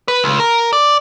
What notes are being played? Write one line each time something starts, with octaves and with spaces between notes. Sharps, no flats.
B4
C#2
A#4
D5